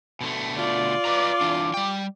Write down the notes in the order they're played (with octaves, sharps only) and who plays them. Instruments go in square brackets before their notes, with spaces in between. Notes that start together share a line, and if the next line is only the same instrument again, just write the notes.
[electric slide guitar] B2 D3 A3
[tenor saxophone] F4 [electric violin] D5
[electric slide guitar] B4 D#5 A#5 [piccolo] D6
[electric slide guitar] E3 D4
G3 G5